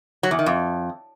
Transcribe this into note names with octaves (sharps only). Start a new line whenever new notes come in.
F#3
E2
D#3
F2